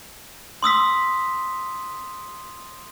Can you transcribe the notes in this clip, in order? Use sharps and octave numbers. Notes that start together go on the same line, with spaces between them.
C6 D#6 E6 B6